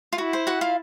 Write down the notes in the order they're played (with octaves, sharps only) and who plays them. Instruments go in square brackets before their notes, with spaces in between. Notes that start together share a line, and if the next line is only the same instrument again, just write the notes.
[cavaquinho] F4
[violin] E4 [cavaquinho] F#4
[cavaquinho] C5
F#4 F#5
F4 F5